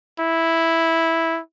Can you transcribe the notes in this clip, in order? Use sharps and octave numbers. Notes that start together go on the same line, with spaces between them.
E4